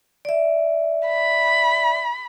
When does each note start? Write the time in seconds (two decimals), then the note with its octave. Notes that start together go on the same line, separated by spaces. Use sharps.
0.25 D5 E5
1.07 B5